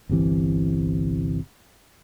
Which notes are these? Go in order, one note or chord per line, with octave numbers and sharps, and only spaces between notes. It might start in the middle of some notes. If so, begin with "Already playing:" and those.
G1 C2 C3 E3